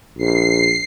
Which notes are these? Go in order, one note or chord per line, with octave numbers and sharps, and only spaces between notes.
A#1 C7